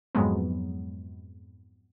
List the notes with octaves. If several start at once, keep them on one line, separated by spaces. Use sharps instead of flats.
F2 G#2 F#3 G#3 B3